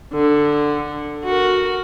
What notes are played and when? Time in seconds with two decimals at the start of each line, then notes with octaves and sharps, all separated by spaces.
0.14 D3
1.25 F#4 A#4